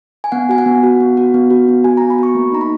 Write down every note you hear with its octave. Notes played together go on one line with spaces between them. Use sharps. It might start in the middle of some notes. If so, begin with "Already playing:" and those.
G#5
B3 F#5
F#4 G#5
F#5
B3
F#4
B3
F#4
B3
F#4
B3
F#4 G#5
B3 A#5
B5
F#4 C#6
A#3
D#4 A#5
B5